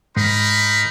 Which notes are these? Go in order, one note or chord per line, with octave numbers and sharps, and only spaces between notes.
G#2 D#4 A#4 B5